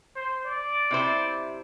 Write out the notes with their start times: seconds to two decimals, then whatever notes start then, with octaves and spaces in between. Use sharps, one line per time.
0.16 C5
0.46 D5
0.91 C3 E4 C5